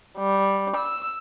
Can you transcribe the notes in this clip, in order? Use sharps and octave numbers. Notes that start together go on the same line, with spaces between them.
G3
E6